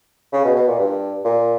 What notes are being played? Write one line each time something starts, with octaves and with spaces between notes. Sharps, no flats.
C#3
B2
B2
A#2
G2
A#2